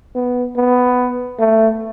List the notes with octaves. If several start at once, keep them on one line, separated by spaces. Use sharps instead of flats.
B3
B3
A3